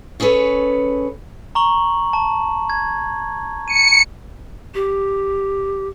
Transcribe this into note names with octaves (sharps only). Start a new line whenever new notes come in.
C#4 G#4 A4 B4 C#5
A#5 C#6 F#7
A5
G#6
C#7 D#7
G4